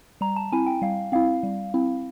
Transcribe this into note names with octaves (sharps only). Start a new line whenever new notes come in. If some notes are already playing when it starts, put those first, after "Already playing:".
G3 A#5
A5
C4 E4 G#5
G5
G3 F5
C4 E4 F5
G3
C4 E4